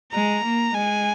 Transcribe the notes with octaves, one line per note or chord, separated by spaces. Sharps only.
G#3 A#5
A#3
G#3 G#5